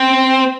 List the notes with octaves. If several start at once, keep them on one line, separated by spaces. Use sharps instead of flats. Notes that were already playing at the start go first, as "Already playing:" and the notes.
Already playing: C4